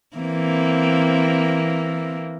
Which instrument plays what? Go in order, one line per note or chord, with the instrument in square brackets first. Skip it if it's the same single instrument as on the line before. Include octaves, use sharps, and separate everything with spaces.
[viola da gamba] E3 A#3 C4